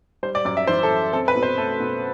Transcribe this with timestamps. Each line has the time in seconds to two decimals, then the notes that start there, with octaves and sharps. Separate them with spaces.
0.23 G3 C5
0.35 D5
0.45 F#2 D5
0.57 E5
0.67 E3 C5
0.83 A4
0.90 F#2
1.13 C4 A4
1.28 B4
1.36 B2
1.43 C5
1.58 A3 A4
1.80 B2